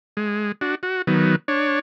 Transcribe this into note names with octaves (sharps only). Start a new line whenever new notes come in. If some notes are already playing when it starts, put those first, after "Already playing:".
G#3
D4 F#4
F#4
D#3 F#3 B3
D4 C#5